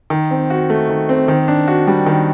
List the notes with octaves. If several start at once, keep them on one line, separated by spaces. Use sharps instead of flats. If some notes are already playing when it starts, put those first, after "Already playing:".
D#3
C4
F#4
A3
D#3
C4
D#3
D4
F#4
G3
D#3